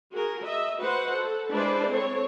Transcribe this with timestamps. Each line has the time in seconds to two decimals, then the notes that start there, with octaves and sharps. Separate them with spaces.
0.13 F#4 G#4 A#4
0.43 D#5 E5
0.80 F#4 B4 C5 F#5
1.14 A4
1.52 G#3 D4 E4 B4 C5 D5
1.91 C4 A4 C#5